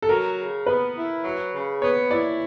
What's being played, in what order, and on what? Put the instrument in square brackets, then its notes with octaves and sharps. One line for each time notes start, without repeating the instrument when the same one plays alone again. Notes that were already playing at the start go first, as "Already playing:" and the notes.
[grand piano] A4
[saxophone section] F#3 [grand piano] A#4
[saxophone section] C#3
[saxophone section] B3 [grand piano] B4
[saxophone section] E4
F#3
C#3
[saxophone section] B3 [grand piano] C#5
[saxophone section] E4 [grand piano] D5